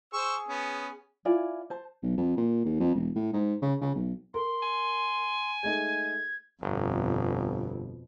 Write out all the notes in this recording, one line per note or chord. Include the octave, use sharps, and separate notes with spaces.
G#4 C5 C#6 E6
B3 C#4
E4 F4 D5 G#5
C5 A5
B1
F2
A#2
D#2
F2
E1
A2
G#2
C#3
C#3
B1
A#4 C6
G#5
G#3 A3 D#4 G#6
G1 F2 B2